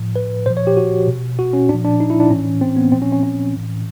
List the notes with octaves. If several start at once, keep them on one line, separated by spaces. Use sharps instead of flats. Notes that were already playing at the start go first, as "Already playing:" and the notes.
Already playing: A2 F3
B4
A#2 F3 C5
C#5
G4
F#4
B2
F#4
C#4
A#2 F3 D4
D4
D#4
E4
D4
A2 E3 C#4
C4
B3
A#2 F3 C4
C#4
C#4
C#4
A2 E3